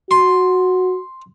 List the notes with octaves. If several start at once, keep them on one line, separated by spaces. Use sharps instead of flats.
F#4 C6